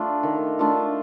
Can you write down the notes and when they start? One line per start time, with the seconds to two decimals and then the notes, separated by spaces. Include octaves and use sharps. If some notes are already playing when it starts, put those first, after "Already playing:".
Already playing: A3 D4 F4
0.23 D#3
0.59 A3 D4 F4